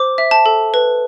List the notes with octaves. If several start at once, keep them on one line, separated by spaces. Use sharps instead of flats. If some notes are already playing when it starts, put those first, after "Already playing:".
Already playing: C5 D6
E5
A5
A4
B4